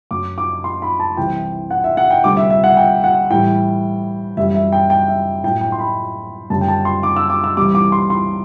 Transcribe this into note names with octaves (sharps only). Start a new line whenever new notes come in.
F#2 F#3 D6
D6
C6
B5
A5
C2 C3 E3 G5
F#5
E5
F#5
G5
D2 C3 G3 D6
E5
E5
F#5
G5
F#5
A2 E3 G3 G5
F#2 E3 G3 E5
E5
G5
G5
E5
A2 F#3 G5
G5
C6
B5
F#2 D3 G3 A5
G5
A5
C6
D6
E6
D6
E6
C2 C3 E3 G3 D6
D6
C6
C6